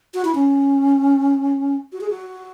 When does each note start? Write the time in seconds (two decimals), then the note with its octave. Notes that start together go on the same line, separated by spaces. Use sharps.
0.14 F#4
0.25 E4
0.35 C#4
1.93 F#4
2.01 G#4
2.10 F#4